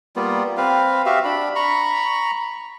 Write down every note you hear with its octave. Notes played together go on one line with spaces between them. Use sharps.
G3 A#3 B3 F4
C4 B4 F5
F#4 G4 E5 F5
D4 B5
A#5 B5 C#6